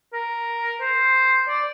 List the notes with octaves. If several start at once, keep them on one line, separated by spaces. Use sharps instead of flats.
A#4
C5
D5